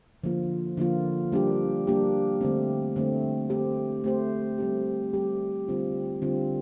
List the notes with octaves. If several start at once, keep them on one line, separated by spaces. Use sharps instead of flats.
D3 F3 A#3 F4
D3 F3 A#3 F4
G3 A#3 D4 G4
G3 A#3 D4 G4
D3 A3 C4
D3 A3 C4
A3 C4 G4 C5
A3 C4 G4 C5
G3 C4 G4
G3 C4 G4
D3 G3 C4 F4
D3 G3 C4 F4